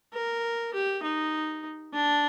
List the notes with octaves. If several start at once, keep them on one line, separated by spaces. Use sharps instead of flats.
A#4
G4
D#4
D4